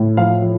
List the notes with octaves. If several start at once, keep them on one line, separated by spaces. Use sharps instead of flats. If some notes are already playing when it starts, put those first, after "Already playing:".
Already playing: A2
F3 F5
F3